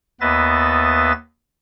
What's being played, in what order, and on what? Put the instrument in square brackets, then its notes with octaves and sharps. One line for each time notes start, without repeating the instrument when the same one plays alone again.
[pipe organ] D#2 B3 B4 D#5 E5 A6